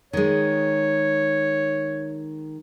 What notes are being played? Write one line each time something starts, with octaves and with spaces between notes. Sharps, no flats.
D#3 G#3 C#5